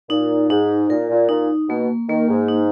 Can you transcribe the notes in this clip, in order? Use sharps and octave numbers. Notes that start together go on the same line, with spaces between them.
A#2 D#4
G#2 D#4
A#2 A#4
A#2
A#2 D#4
B2 A#3
D#3 A#3
G#2
D#4